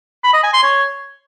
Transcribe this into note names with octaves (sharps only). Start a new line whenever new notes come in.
B5
D#5
G#5
C6
C#5